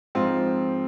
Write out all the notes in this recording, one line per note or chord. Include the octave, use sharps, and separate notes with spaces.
G#2 F3 C4 F4